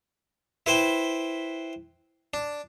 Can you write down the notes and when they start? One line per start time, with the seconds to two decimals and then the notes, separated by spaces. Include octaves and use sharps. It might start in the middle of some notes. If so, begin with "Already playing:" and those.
0.66 E4 B4 C5 G5
2.34 D4